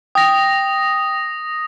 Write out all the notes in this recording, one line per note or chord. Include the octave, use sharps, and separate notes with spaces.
G5 D#6 A#6